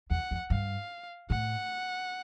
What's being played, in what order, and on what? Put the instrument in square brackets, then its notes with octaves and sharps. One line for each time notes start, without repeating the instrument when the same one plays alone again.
[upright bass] E2 [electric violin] F#5
[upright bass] F2
[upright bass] G2 [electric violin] F5
[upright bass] A2 [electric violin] F#5